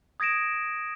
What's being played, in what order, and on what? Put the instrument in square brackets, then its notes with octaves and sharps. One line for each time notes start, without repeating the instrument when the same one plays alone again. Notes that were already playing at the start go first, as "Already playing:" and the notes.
[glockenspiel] D#6 G#6 A#6 D7 E7